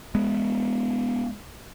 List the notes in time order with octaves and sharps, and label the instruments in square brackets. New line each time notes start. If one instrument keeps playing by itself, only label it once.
[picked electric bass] G#3 B3